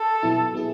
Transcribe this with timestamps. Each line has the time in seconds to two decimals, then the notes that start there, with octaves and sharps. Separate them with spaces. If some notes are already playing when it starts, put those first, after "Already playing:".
Already playing: A4
0.23 B2 F#3 B3 E4
0.54 F#3 B3 E4 G#4